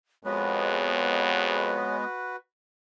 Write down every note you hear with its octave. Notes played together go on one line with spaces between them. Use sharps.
F2 G#3 B3 F#4 B4 C#5